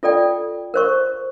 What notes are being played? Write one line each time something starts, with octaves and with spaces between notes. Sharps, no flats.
F4 A4 D5 G5
A#4 C5 C#6